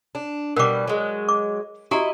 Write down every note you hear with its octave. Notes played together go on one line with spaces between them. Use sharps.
D4
B2 G3 A#4 D6
F#3 G#3
D6
E4 F#4 G4 D#5 A#5